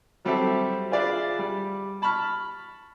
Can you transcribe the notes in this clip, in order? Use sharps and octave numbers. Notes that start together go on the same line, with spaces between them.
F#3 G3 C4 G4 A4 E5
F4 G#4 B4 D5 E5 F5
G3
A5 B5 C#6 F6